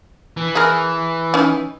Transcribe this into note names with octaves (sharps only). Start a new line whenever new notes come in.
E3
G#4 A#4
C#4 D#4